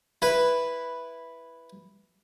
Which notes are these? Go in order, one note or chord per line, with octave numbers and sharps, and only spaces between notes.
E4 B4